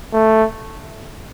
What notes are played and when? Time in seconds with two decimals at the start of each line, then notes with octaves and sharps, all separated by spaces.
0.13 A3